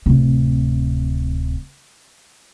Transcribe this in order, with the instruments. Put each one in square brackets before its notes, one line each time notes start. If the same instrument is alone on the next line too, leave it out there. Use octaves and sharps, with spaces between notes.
[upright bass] D1 C3